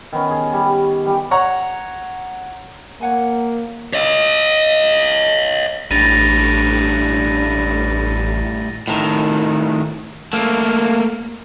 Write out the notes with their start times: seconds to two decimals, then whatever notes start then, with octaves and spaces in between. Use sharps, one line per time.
0.12 D#3 B3 C#4
0.31 G#4
0.53 G3
1.06 G3 G4
1.31 C#5 F#5 A#5 C#6
3.01 A#3 C#5 F#5 G#5
3.93 C#5 D#5
5.91 A1 A2 G3 D4 A6 A#6 D#7
8.88 A2 D#3
10.33 A3 A#3